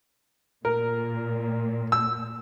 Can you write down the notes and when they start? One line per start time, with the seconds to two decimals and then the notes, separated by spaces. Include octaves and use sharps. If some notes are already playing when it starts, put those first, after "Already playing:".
0.65 A#2 A#4
1.92 E6